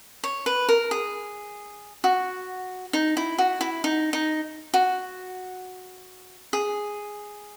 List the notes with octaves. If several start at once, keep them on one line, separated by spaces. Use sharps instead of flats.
C#5
B4
A#4
G#4
F#4
D#4
E4
F#4
E4
D#4
D#4
F#4
G#4